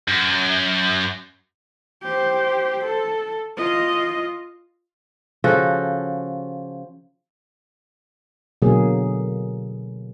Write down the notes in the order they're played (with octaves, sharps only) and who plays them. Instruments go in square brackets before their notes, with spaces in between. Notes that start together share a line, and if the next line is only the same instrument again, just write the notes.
[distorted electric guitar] F#2
[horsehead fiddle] G4 C5
A4
F4 D#5
[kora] C#3 F3 F#4 A4
[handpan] B2 D3 F#3 A#3 G#4